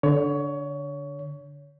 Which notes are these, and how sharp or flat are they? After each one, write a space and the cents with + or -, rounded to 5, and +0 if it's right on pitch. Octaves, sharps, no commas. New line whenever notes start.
D3 -10 C#5 +20